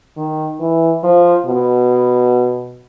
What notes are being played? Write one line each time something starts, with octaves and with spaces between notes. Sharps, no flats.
D#3
E3
F3
B2